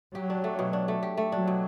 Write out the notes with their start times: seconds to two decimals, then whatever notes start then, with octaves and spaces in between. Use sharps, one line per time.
0.14 F#3 G4
0.30 D4
0.44 A3
0.59 B2
0.73 D4
0.88 A3
1.03 G4
1.17 A3
1.32 F#3 D4
1.47 B2